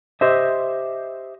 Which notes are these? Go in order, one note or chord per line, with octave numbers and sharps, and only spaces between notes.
G4 C5 D#5 E5